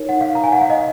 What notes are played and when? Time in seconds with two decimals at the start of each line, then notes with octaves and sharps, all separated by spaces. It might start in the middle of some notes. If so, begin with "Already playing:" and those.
Already playing: D#4 A#4 C#5
0.09 F#5
0.21 F5
0.35 A#5
0.44 G#5
0.52 F#5
0.62 F5
0.70 D#5